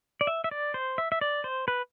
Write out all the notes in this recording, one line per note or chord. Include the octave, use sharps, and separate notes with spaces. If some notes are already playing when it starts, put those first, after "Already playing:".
D5
E5
E5
D5
C5
E5
E5
D5
C5
B4